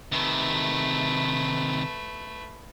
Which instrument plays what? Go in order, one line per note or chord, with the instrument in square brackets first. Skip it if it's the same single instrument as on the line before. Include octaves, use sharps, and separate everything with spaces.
[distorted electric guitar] C3 D#3 [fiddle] A3 B4